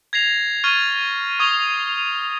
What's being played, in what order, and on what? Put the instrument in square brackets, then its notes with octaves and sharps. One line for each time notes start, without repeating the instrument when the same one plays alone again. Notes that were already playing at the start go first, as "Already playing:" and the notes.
[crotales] G#6 A#6 C7 F7
C#6 F6 G#6 A6 D#7
C#6 D#6 G#6 F7 G7